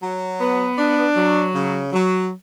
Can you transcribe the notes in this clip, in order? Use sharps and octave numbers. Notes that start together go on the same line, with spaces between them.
F#3
B3
D4
F#3
C#3
F#3